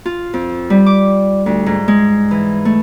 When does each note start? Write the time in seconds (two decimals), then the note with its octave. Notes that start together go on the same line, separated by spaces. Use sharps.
0.06 F4
0.34 F2
0.70 G3
0.86 D6
1.46 D2
1.66 G#2
1.88 G#3
2.31 E3
2.65 A3